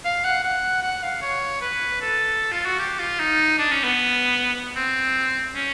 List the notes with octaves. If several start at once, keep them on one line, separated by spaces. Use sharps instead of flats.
F5
F#5
F#5
F#5
F5
C#5
B4
A4
F4
F#4
G4
F4
D#4
D4
C#4
B3
C4
C#4